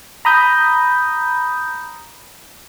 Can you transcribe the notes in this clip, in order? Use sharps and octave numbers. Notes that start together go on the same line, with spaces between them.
A#5 B5 D#6 G6